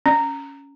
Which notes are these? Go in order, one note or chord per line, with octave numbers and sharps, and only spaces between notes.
C#4